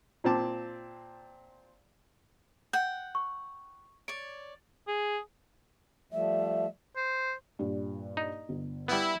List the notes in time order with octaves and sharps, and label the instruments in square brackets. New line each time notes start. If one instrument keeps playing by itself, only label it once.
[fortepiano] A#2 C4 A5 D6
[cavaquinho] F#5 G5 [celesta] G6
[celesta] C#6
[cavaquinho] C#5 D5 [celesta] D7
[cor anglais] G#4
[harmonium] F3 G3 A3 [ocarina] E5
[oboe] C5
[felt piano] G2 A#2 G4
[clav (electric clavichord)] D#4
[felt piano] G1
[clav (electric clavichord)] G3 B3 [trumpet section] E4